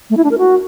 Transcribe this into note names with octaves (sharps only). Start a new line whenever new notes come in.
A3
E4
D4
A#4
F#4